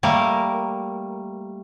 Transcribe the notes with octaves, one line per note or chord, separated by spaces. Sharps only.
G3 A3 A#3 A#4